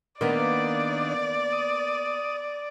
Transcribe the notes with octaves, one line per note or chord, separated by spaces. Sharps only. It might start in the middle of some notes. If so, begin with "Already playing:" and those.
D#3 A#3 B3 D4 D5
D#6